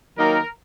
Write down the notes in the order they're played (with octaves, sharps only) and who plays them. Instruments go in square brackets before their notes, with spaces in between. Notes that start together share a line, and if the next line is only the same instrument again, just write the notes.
[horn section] D#3 F#3 A#3 D#4 A#4